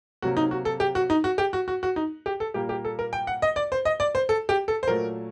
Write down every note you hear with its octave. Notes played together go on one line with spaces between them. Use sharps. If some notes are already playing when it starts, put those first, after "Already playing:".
C3 F#3 A#3 F#4
D#4
F#4
A4
G4
F#4
D#4
F#4
G4
F#4
F#4
F#4
D#4
G4
A4
A#2 G3 A#3 G4
G4
A4
A#4
G5
F#5
D#5
D5
C5
D#5
D5
C5
A4
G4
A4
C5
A#2 F#3 A3 A#4